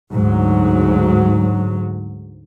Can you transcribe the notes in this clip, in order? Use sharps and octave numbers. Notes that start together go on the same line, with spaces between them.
D2 G#2 F#3